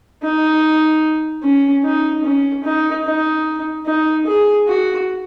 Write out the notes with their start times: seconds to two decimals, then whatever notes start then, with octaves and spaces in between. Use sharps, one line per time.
0.23 D#4
1.43 C#4
1.84 D#4
2.24 C#4
2.64 D#4
3.05 D#4
3.86 D#4
4.26 G#4
4.67 F#4